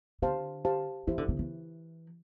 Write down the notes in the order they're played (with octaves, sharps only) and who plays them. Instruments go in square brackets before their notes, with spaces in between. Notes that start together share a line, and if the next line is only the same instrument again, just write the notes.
[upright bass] D3 [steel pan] G4 C5 F5 A5
[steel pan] G4 C5 F5 A5
[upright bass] E3 [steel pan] E4 G4 C5
[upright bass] D3
D3
E3